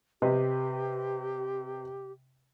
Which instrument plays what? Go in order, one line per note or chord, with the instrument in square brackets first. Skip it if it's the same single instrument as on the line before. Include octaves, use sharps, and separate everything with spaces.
[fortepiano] C3 B4 D#5 [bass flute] G4